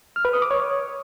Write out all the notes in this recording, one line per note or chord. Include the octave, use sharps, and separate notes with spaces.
F6
B4
D#6
D6
C#5